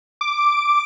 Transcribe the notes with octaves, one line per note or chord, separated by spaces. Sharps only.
D6